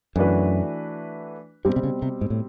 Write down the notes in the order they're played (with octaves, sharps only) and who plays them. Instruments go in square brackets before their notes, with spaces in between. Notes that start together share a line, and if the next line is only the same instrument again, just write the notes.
[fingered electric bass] F#2 [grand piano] E3 A3 D4 F#4 B4
[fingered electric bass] G2 [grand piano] B2 G3 C4
[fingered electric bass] C3
C#3
C3
G#2
A2